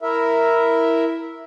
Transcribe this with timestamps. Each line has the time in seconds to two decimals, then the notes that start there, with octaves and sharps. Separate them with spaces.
0.02 E4 A#4 E5